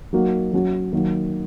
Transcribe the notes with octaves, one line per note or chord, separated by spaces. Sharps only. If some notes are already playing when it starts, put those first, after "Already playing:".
F#3 A#3 D#4 F#4
F#3 C#4 F#4
D#3 F#3 A#3